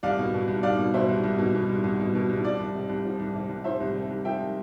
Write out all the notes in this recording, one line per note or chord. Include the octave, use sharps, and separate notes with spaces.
C2 D5 F5
B2
B2
C2
C2 D5 F5
B2
B2 C5 E5
C2
C2
B2
B2
C2
C2
B2
B2
C2
F3 D5
C2
C3
C2
F3
C2
C3
C2
F3 C5 E5
C2
C3
C2
F3 E5 G5